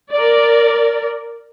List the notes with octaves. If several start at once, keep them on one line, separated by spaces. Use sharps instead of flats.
A#4 D5